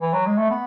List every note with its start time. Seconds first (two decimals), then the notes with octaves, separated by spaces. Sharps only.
0.01 E3
0.13 F#3
0.26 G#3
0.37 A3
0.50 B3